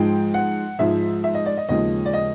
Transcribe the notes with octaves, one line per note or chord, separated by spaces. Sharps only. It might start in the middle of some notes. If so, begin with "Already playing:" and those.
Already playing: G#2 F3 G#3 G5
F#5
G#2 F3 G#3 E5
E5
D#5
D5
D#5
D#2 C#3 F3 G#3 D#5
D5
D#5